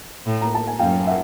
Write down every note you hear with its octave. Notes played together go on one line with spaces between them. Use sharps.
A2
A#5
A5
G#5
F#2 F5 G5
E5 F#5